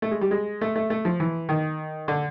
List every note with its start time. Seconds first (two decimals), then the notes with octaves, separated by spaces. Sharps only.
0.02 A3
0.11 G#3
0.21 G3
0.31 G#3
0.61 A3
0.76 A3
0.90 A3
1.05 F3
1.20 E3
1.49 D#3
2.08 D3